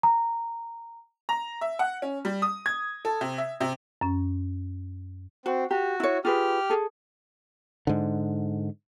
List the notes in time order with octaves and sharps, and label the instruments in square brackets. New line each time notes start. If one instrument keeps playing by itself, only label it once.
[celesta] A#5
[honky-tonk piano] A#5
E5
F#5
C#4
G3
D#6
G#6
A4
C3
E5
C3
[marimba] F#2 C#4
[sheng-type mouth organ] C4 [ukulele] F#4
[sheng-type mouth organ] F#4 [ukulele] G4
[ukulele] E4 C#5
[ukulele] F4 G#4 B4 [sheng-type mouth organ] G4 F6
[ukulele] G#4 A4
[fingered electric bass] G#2 D3